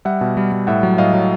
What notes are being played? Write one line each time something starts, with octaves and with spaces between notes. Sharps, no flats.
G3 E5 F#5
B2
G3
G3
A2 E5 F#5
F#3
A2 D#5 F5
F#3